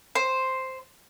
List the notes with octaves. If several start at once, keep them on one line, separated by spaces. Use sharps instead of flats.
C5